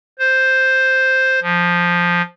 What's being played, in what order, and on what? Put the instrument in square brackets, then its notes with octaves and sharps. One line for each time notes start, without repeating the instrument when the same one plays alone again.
[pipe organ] C5
F3